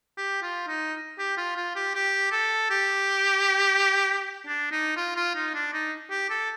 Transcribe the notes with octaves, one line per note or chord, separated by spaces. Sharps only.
G4
F4
D#4
G4
F4
F4
G4
G4
A4
G4
D4
D#4
F4
F4
D#4
D4
D#4
G4
A4